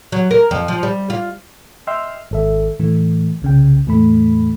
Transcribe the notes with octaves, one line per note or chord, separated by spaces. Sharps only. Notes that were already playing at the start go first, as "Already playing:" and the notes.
F#3
A#4
F2
F3
G3
F4
D#5 E5 G5 C6 E6 F6
G#1 A4 E5
A2 E3 A3
C2 C#3 G5
E2 A2 A3 B5